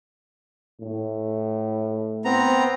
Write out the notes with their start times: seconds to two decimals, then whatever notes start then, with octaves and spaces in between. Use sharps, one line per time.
0.80 A2
2.25 B3 C4 A#5